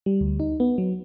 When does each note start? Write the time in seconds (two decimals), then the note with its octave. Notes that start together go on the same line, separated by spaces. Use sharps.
0.06 G3
0.21 D2
0.40 D#4
0.60 B3
0.78 F#3